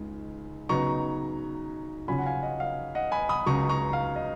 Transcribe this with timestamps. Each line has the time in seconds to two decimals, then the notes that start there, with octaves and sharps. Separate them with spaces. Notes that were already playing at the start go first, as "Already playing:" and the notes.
Already playing: C#2 C#3 G#3 D#4
0.69 C#3 F#3 B3 D#4 A#5 C#6
2.08 C#3 F#3 C#4 F4 G#5 B5
2.18 F#5
2.26 F5 G#5
2.43 D#5 F#5
2.60 F5
2.95 D#5 F#5
3.12 G#5 B5
3.29 B5 D#6
3.46 C#2 C#3 F#3 A#5 C#6
3.69 A#5 C#6
3.93 F5
4.16 D#5